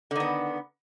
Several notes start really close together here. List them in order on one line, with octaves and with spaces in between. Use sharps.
D3 D#3 B3